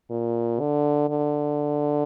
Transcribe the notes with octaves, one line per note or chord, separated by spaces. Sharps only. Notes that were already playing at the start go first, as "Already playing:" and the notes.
A#2
D3
D3